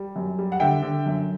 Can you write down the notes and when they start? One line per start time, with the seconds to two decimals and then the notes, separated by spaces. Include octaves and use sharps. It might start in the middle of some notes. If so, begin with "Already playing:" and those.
Already playing: G3
0.16 F#2
0.39 G3
0.52 F#5
0.60 D3 E5 G5
0.82 D3
1.06 F#2